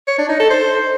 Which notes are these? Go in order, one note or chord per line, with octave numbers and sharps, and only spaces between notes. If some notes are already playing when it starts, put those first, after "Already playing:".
C#5
D4
D#4
A4
C5